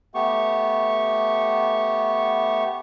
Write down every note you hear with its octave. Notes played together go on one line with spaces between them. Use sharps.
A3 B3 G4 C#6